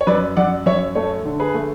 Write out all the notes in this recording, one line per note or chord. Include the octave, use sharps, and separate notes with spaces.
C#5
F#2 B4 D5
F#2 D5 F#5
F#2 C#5 E5
A3 A4 C#5
D3
G#4 B4
A3